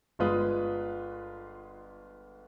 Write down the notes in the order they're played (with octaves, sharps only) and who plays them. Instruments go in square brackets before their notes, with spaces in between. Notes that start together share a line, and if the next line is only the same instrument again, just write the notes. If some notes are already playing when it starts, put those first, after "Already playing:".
[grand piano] G1 G#3 F4 B4 D#6